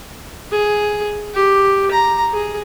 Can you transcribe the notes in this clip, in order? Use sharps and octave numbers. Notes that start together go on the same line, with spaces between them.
G#4
G4
A#5
G#4